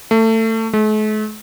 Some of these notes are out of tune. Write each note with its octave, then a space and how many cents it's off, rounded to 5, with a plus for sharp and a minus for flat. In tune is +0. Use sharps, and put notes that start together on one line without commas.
A3 +25
A3 -45